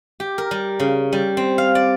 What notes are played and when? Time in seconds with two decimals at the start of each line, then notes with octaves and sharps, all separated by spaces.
0.20 G4
0.38 A#4
0.51 G3
0.80 C#3
1.13 G3
1.37 C4
1.58 F5
1.75 D5